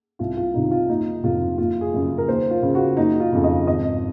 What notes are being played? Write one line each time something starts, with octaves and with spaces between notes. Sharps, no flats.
C2 F4
F4
C3 D#3 D#4
F4
F#1 D#4
F2 C3 F4
F#1 F4
G#4
F#2 C#3
A#4
D#2 C5
F4
C#3
F#4
F#1 D#4
F4
F2 C#3
D#5
G#1 D#5